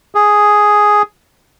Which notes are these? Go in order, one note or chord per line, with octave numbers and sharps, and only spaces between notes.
G#4